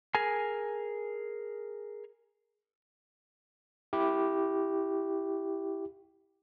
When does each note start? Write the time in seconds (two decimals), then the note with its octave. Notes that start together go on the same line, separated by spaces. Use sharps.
0.15 G#4 A#4 G#5
3.93 E4 G4